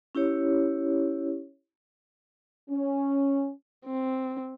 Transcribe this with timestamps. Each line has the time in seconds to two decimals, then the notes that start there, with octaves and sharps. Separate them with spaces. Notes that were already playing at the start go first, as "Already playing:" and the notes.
0.15 C#4 E4 G4 C#5
2.70 C#4
3.86 C4